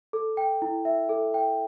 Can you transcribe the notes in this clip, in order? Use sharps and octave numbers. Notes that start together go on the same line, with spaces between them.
A4
G5
E4
E5
A4
G5